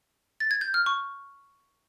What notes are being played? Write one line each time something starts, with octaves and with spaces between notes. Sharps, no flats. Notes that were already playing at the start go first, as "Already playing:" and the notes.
A6
G#6
G6
F6
C#6